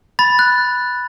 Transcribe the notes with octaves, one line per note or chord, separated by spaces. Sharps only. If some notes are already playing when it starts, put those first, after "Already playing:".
B5 A6
F#6